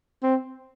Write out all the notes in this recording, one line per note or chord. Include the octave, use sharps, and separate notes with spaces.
C4